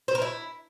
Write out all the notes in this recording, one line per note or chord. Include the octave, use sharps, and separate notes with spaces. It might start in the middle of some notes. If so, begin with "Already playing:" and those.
C5
A#4
E4